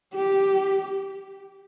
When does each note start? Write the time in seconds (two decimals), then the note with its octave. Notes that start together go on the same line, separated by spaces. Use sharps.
0.15 G4